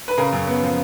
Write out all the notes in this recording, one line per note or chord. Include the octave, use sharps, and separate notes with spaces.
B4
C#3 A#4
F#2
B3
F3